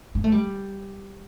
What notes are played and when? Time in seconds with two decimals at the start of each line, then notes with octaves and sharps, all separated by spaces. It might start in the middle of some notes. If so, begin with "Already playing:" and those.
0.15 A#3
0.24 A3
0.32 G3